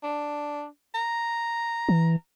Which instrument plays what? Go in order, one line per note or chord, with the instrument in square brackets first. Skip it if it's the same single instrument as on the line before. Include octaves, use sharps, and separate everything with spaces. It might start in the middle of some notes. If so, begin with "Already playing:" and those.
[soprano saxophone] D4
A#5
[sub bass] E3